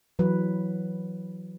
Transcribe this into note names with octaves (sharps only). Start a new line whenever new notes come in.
E3 F#3 B4